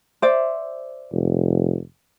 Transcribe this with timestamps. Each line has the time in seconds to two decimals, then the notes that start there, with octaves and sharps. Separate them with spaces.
0.22 C5 D5 E5
1.12 F1